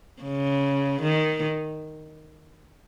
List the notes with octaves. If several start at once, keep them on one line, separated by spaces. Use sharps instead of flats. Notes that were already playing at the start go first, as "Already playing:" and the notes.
C#3
D#3